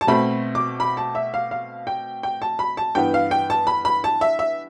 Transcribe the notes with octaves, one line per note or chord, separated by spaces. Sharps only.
A5
B2 A3 C4 B5
D6
B5
A5
E5
F5
F5
G5
G5
A5
B5
A5
G2 E3 B3 G5
F5
G5
A5
B5
B5
A5
E5
E5